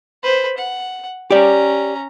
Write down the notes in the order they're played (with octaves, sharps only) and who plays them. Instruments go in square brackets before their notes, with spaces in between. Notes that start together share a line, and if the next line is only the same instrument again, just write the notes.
[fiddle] B4 C5
F#5
[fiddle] C#4 A#5 [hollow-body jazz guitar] G4 D5